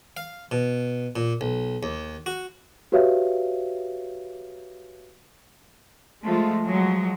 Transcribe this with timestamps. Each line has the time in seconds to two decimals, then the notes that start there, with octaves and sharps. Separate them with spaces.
0.17 F5
0.51 B2
1.16 A#2
1.41 B1
1.83 D#2
2.26 F#4
2.92 F#4 G4 B4 C#5 E5 F5
6.24 F3 G#3 A3 F4
6.64 F3 F#3 G#3